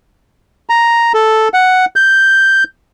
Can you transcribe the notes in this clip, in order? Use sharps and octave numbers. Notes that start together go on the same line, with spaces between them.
A#5
A4
F#5
G6